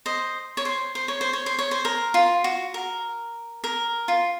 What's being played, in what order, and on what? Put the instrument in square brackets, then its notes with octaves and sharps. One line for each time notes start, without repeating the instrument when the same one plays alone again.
[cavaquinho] C5 D#5
C#5
C5
C5
C#5
C5
C#5
C5
C#5
C5
A#4
F4
F#4
A#4
A#4
F4